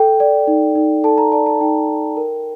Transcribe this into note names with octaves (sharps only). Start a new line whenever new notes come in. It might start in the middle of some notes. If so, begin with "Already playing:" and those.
Already playing: A4 G5
D5
D#4
D#4
A4 A5
A#5
D5 A5
A5
D#4 G5
D#4
A#4